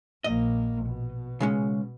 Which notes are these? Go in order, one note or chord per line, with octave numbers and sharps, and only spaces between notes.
A#1 A#3 D#5
B2
C#3 G#3 C#4